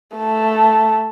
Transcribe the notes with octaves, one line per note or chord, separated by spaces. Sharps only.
A3 A5